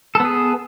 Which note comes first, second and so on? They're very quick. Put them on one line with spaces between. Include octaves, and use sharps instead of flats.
A4 B3 G#4